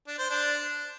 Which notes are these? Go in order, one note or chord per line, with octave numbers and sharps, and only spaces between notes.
D4
C5
D4